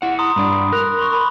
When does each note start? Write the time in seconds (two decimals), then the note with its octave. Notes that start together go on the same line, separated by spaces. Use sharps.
0.02 E4 F#5
0.19 A#5 C6 D#6
0.36 G2 D4 B5
0.73 A#4 F#6 F7
0.99 C6 C#6
1.13 B5 C6